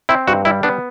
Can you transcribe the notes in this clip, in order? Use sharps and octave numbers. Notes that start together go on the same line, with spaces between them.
C4 E4
G2 F#4
G3 E4
B3 D4